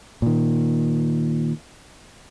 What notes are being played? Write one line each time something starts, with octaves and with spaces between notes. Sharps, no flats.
A#2 D#3